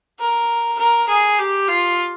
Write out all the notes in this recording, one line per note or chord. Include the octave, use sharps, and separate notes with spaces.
A#4
A#4
G#4
G4
F4